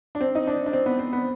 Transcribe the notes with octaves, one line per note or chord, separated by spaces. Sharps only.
D4
C4
D#4
D4
D4
C4
B3
C4
B3